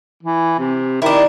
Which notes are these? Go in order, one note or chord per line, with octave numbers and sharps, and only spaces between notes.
E3
C3
D#3 D4 E4